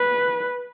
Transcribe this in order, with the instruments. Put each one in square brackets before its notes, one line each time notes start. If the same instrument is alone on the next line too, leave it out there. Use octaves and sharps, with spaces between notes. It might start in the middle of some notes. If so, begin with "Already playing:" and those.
Already playing: [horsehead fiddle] B4